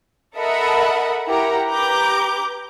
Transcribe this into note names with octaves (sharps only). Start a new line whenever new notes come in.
A4 A#4 D#5 E5 F#5 B5
E4 G4 A#4 F#5 G5 A#5
G4 B4 A#5 D6 G6